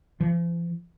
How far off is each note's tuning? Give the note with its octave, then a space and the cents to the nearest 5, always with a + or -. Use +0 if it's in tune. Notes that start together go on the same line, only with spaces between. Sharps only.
F3 -45